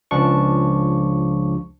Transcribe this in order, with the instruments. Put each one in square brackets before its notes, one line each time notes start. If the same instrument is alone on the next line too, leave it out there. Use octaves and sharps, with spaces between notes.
[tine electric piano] C#2 F3 D4 C#6